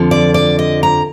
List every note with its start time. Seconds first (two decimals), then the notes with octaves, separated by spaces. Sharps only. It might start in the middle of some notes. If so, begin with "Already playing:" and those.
Already playing: F2 D3 F3
0.11 D5
0.34 D5
0.59 D#5
0.83 A#5